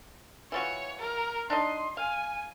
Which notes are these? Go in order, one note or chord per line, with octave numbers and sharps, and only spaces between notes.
E3 F4 F#4 C#5
A#4
D4 D#4 D#5 C6
F5 G#5